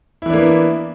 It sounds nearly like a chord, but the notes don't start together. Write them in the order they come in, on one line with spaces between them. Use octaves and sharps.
E4 E3 D4 A#3 B3